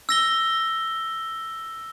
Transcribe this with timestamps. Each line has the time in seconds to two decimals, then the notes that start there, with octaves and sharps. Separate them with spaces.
0.09 E6 A#6 G7